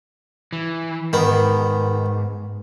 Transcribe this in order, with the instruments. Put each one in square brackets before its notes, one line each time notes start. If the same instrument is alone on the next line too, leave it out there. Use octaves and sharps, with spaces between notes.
[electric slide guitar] E3
[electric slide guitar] G#2 [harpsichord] D#3 B3